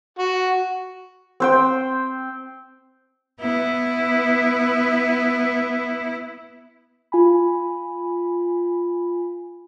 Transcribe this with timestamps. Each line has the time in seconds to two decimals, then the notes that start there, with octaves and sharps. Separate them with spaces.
0.19 F#4
1.40 C4 C5 G5
3.40 B3 E4
7.12 F4 G#5 B5